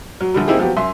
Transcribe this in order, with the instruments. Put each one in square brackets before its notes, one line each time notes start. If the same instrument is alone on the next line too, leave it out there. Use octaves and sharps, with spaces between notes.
[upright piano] F#3
A#1 D3 G3
A#3 C4 D#4 E4 G4 G#4
F3 F#3 B3 G4
F#2 E5 C6